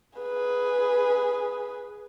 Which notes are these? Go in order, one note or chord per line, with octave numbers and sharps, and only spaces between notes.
G#4 B4